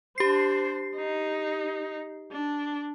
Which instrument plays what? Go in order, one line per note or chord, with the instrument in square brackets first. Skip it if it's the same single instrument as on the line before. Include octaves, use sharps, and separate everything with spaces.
[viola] D4 C5 [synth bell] G4 C7
[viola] D#4
D4